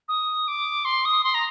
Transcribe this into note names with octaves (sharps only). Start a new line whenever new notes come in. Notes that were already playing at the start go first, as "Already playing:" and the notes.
D#6
D6
C6
D#6
C6
A#5